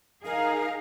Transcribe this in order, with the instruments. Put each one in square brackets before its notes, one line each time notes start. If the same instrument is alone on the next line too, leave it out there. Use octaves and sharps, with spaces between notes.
[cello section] D#4 G#4 F5 [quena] A#4